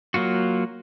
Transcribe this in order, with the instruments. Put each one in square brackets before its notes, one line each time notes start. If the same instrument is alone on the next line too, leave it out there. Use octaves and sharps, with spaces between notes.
[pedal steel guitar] F#3 A#3 F4 F#4